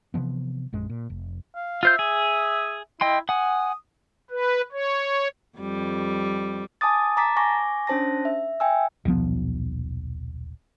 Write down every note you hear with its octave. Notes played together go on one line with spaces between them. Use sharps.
C3 E3 F3 B3
A#1 F#2 G#3
A#2
F1
F5
F4 C5 E5 G6
G#4
E4 D#5 G5 C6
F#5 G#5 D#6
B4
C#5
F2 G3
G#5 A5 D6 D#6 A6
A5 A#5 D6 A6 B6
G#5 C#6 D6 A#6
C#4 D4 C5 A5 A#6
E5
E5 G5 G#5 E6
D#1 B1 F3 B3